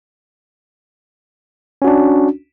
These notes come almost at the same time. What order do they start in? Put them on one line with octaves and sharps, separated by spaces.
C#4 F#4 D4